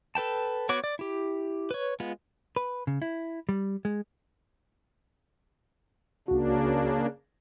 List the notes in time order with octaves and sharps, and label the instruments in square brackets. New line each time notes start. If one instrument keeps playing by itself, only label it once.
[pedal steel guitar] A4 B4 G5 A5
B3 F#4 C#5 D6
D5
E4 G4
B4 C#5
G#3 B3 F4
[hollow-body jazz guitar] B4
C#3
E4
G3
G#3
[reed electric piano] C#2 F#4 [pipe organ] C#3 A#3 D4